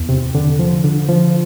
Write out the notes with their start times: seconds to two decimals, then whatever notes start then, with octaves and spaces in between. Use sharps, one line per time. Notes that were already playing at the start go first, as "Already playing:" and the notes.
Already playing: E2
0.09 C3
0.35 D3
0.59 F3
0.84 D3
1.09 F3